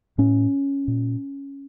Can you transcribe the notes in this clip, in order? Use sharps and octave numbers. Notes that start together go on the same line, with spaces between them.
A2 C#4
A#2